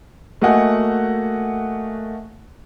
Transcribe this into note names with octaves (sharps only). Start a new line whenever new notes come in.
A3 A#3 F#4 D#5 F#5 G#5